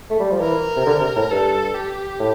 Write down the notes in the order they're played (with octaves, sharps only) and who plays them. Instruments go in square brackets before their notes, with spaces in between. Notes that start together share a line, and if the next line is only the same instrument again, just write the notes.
[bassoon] A3
G3
F3
[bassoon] E3 [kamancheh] A#4
[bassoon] C3
D3
C3
A2
[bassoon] G2 [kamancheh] A4
[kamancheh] G4
[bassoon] A2